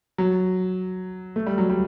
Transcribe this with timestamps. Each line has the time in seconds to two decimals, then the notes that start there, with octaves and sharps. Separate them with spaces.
0.18 F#3
1.36 A3
1.46 G3
1.58 F#3
1.70 G3